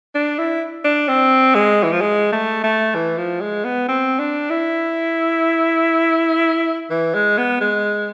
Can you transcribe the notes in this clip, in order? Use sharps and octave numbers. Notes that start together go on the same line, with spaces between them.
D4
E4
D4
C4
G#3
E3
F3
G#3
A3
A3
E3
F3
G#3
B3
C4
D4
E4
E3
G#3
B3
G#3